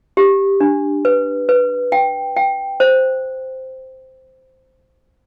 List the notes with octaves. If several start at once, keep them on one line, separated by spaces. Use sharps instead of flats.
G4
D4
B4
B4
G5
G5
C5